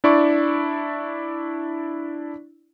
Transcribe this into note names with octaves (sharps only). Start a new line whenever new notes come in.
D4 E4 D5 C#6